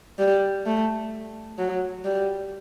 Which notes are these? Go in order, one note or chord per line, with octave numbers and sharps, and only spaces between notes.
G3
A3
F#3
G3